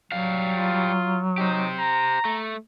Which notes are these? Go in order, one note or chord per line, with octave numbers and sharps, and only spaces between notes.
F#3 G3 F5
F4
D#4 G4 C5
A#5
A3